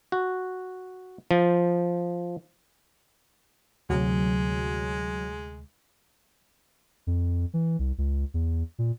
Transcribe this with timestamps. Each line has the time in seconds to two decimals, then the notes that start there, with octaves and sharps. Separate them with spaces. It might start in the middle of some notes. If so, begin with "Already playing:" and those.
0.12 F#4
1.31 F3
3.90 D2 C3 F#3 G#3
7.07 F2
7.54 E3
7.79 C2
7.98 C#2
8.34 E2
8.79 A#2